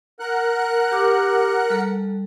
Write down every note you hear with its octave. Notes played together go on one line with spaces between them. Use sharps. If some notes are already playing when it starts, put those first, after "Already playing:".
A#4 F#5 F#6
G4 D6
G3 A4